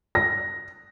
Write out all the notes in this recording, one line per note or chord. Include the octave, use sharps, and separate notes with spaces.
A#6